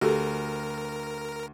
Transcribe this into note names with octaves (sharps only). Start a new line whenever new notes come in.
D2 F#4 G4 A4 A#4